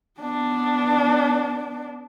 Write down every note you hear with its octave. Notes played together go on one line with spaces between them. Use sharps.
B3 D4